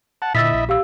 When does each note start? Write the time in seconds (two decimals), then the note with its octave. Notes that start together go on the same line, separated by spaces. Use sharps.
0.22 F#5 A5
0.35 A#2 D3 E4 D#5 E5 E6 A6 B6
0.53 A#1
0.69 G4 F5 E6